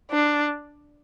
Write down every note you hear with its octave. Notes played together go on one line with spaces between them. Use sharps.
D4